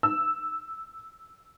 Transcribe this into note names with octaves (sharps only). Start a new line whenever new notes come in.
E6